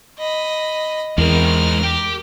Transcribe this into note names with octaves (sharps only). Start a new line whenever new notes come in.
D#5 B5
E2 G#3 C4 A#4 F6
G4